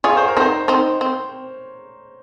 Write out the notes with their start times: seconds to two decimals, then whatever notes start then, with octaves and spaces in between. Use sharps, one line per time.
0.04 F4 G#4 C#5
0.17 C5
0.28 A#4
0.37 C4 D#4 C5
0.68 C4 D#4
1.01 C4